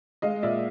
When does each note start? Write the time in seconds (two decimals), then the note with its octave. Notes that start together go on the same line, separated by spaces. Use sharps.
0.22 G#3 D#5 F5
0.43 A#2 D5 E5